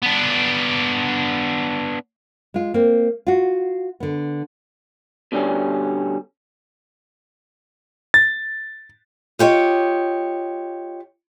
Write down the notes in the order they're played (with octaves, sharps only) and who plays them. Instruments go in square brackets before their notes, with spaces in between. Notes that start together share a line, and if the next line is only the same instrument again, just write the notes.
[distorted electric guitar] B3 D4
[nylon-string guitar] G#3 F4
A#3 C4
F4 F#4
D3 B3
[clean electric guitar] B2 D3 G3 C#4
[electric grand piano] A6
[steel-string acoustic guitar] F4 G4 C#5 D#5